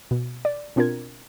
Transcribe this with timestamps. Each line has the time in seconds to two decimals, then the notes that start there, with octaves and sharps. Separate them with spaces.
0.11 B2
0.45 D5
0.76 B2 C4 D4 F4 A#4 G#6